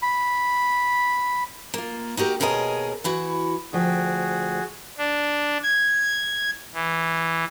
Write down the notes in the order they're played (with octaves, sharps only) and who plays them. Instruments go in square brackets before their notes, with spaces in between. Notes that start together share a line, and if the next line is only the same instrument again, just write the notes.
[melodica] B5
[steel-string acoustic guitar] A#3 F4
D#4 F#4 G4 A#4
D#2 B2 G#4 A#4 C#5 D#5
E3 E4 F#4
[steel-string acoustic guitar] D2 F3 G5 [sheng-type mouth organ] F#4 G#4
[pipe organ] D4
G#6
E3